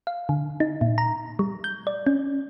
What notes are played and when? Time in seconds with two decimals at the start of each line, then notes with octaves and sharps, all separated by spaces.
0.07 F5
0.29 D3
0.60 D#4
0.81 A#2
0.98 A#5
1.39 G3
1.64 G6
1.87 D5
2.07 C#4